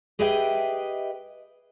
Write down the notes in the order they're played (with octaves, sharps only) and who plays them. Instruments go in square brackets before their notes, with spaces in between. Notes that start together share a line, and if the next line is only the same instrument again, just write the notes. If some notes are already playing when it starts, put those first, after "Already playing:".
[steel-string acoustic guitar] G4 G#4 B4 D#5 E5 G5